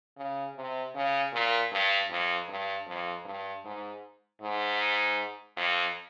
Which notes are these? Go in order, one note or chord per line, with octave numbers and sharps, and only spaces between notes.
C#3
C3
C#3
A#2
G2
F2
G2
F2
G2
G#2
G#2
F2